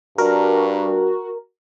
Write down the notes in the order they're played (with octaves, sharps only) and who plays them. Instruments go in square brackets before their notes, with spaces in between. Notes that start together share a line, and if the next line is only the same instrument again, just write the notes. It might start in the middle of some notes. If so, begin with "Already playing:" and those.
[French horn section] G2 G3 D4 [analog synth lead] F#4 [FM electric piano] A#4